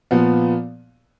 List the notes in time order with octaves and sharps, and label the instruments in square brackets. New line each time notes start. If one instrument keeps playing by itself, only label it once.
[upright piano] A#2 F3 B3